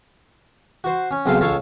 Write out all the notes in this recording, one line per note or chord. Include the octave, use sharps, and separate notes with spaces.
F#4 C5
C#4
B1 C#3 C4 A4 F5
C#2 A4 C#5 F5 A5